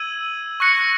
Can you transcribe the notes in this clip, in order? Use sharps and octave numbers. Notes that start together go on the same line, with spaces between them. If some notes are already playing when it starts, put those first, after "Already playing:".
Already playing: E6 G#6 D#7 F#7
C#6 F#6 A#6 C#7 F#7